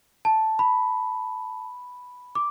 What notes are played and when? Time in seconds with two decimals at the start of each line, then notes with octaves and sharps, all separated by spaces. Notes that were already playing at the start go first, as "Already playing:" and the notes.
0.25 A5
0.59 B5
2.35 D6